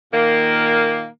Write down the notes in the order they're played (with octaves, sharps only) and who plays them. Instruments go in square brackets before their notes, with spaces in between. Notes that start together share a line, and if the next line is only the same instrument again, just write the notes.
[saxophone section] A#2 D#3 A#3